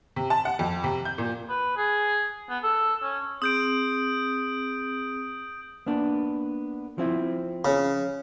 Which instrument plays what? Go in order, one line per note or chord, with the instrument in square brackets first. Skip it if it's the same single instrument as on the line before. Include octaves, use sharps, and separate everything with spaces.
[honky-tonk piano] C3
A5
F#5
F2
C3
G6
A#2
[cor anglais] B4
G#4
B3
A4
C#4
[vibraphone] C4 G#4 [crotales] D#6 G6 D7
[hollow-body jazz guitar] A#3 B3 D4
F3 C4 E4
[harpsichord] C#3